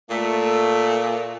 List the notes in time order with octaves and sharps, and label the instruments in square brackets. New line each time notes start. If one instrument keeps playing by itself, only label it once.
[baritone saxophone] A#2 [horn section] A3